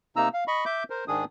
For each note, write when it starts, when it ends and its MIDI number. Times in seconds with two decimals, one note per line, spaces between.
0.16 0.29 48
0.16 0.29 58
0.16 0.29 63
0.16 0.29 82
0.16 0.29 88
0.34 0.44 77
0.48 0.65 75
0.48 0.65 83
0.48 0.65 85
0.66 0.84 76
0.66 0.84 86
0.66 0.84 91
0.90 1.05 70
0.90 1.05 72
1.08 1.25 44
1.08 1.25 51
1.08 1.25 62
1.08 1.25 68
1.08 1.25 87